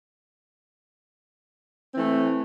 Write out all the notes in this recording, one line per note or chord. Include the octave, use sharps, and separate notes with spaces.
E3 A3 C4